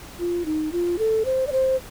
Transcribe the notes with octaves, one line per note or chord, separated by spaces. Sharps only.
F4
D#4
F4
A4
C5
D5
C5